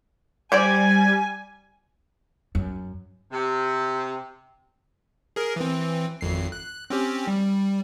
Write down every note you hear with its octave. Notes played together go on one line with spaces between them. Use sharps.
G3 G4 C5 D5 G#5 G#6
F#2
C3
G#4 A#4
E3 C4
G#1 F2 C7
F#6
C4 C#4 G4
G3